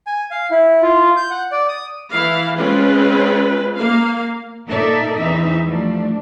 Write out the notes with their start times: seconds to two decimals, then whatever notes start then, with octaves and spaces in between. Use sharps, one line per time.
0.07 G#5
0.31 F5
0.51 E4
0.83 F4
1.17 G6
1.31 F#5
1.52 D5
1.68 D#6
2.12 E3 E4 F5
2.58 G#3 C4 C#4 F4 B4
3.77 A#3 F5
4.67 A#2 D#4 A4 A#4 D5 E5
5.18 E2 E3 C4 D#4 E5
5.65 F3 G3 A3 D4